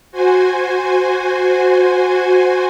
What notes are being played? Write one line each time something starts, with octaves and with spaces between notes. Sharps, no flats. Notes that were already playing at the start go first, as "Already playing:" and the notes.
F#4 C5 G#5